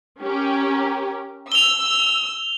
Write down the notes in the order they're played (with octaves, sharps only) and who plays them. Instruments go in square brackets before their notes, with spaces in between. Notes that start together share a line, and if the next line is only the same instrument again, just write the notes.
[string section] C#4 G4 A#4
[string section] E6 [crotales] F7 G7